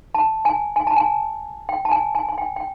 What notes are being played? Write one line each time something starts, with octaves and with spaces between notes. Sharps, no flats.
A5
G#5
G#5
A5
G#5
G5
A5
G#5
G#5
G#5
G5
G5